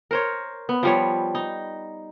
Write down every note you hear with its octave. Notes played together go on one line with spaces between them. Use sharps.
A#4 C5 C#5
B3
F3 G3 C#5
D#4